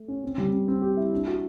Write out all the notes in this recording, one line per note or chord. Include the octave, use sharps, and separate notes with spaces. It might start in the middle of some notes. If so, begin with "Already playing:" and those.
Already playing: A3
C#4
C4
G3
C4
C4
G4
E4
D4
F#4